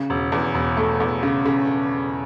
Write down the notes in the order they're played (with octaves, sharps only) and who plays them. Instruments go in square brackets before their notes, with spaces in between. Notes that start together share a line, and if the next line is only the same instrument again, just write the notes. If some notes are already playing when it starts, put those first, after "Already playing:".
Already playing: [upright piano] C#3
E1
E2
E1
A3
E2
C#3
C#3